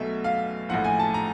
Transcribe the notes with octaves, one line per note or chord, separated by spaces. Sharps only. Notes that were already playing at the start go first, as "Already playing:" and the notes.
Already playing: B1 B2 F#3 A3 E5
F5
A#1 A2 F3 F#5
G#5
A5
A#5